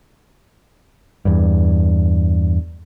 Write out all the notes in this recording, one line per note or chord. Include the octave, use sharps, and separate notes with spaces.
E2 G2